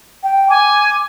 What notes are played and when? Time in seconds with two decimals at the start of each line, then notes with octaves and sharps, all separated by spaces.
0.24 G5
0.50 G#5 D6